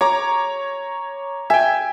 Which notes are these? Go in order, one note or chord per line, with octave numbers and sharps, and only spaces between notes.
C#5 A#5 D6
E5 G5 G#5